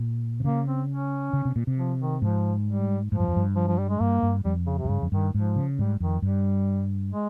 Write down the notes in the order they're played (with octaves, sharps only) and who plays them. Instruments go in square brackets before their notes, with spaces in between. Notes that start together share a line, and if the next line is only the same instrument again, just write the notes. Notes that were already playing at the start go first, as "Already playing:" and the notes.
Already playing: [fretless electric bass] A#2
C3
[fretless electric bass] C#3 [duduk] A#3
[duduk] C4
C#4
[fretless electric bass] C#3
C3
A#2
C3
[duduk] F3
D#3
[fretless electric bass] G#2 [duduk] F3
[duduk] G3
[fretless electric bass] G#2 [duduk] F3
[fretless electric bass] G2
F2
G2
[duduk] F3
F3
G3
G#3
[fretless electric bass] G2 [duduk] A#3
[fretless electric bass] G2
[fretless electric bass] F2 [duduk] G3
[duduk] C#3
C3
[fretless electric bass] F2
[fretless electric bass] G2 [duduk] C#3
[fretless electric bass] F2
[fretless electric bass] G2 [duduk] D#3
[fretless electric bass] G#2 [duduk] F3
[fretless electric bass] C#3
[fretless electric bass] G#2 [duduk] G3
[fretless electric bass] F2 [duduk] D#3
[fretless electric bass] G2 [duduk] G3
[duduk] G#3